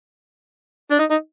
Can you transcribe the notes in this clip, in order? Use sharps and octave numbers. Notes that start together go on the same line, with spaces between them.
D4
D#4
D#4